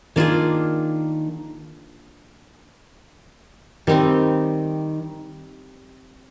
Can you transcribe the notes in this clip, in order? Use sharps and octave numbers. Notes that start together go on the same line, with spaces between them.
D#3 A#3 D4 F4 G#4
D#3 G3 C4 D#4